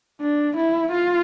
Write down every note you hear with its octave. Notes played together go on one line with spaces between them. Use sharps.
D4
E4
F4